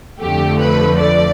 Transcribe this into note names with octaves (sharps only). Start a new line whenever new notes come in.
F2 D3 F3 A3 G4
B4
D5